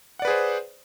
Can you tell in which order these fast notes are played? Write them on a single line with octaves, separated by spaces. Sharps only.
F#5 D5 B4 G#4 C5